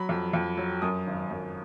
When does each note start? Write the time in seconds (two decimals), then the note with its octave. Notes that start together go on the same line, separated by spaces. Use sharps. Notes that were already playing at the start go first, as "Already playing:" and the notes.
Already playing: F#3 B5
0.09 F2
0.33 F2
0.57 F#3
0.82 F#2 D#6
1.07 G#1
1.31 F#2